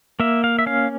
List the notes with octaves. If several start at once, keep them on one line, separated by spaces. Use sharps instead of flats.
A#3 E5
F5
E5
C#4 F5